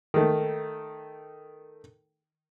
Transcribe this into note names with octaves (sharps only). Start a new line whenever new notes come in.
D#3 A3